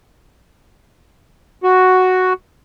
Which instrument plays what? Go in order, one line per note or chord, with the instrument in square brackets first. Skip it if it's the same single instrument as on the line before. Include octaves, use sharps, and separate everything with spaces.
[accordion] F#4